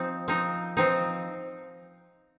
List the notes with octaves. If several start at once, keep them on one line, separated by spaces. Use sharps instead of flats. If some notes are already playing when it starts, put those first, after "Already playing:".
Already playing: F3 C4 D#4
F3 C4 D#4
F3 C4 D#4